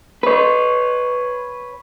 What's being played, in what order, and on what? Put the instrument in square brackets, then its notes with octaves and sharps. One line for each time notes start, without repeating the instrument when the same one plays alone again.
[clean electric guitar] B4 C#5